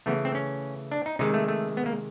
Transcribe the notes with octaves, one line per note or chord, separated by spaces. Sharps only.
C#3 E3 A3 B3
C4
C#4
D4
D#4
C3 D#3 G#3 D#4
A3
A3
B3
A#3